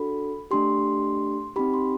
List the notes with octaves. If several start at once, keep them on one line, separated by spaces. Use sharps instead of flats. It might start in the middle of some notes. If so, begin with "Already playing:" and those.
Already playing: D4 F#4 A4 B5
A3 D4 G4 C6
C4 D#4 G4 B5
C6